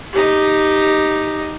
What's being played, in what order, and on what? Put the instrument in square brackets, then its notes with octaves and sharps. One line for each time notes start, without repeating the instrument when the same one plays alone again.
[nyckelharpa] D#4 G4